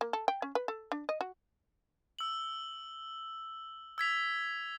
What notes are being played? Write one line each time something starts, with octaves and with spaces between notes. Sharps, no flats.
A#3
A4
G5
C#4
B4
A4
D4
D#5
F#4
E6 F#7
E6 G#6 B6 F7